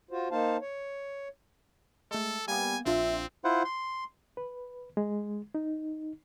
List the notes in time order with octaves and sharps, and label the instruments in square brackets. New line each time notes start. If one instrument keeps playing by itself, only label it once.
[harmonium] F4 F#4 C5
A#3 D#4 C5 F5 A5
C#5
[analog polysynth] G#3 A3 [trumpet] A4
[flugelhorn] G3 [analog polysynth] A#3 B3 [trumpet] G#5
[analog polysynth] A#1 D4 F4 [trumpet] C4 [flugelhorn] E5
[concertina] E4 F4 C5 F#5
C6
[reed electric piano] B4
G#3
D#4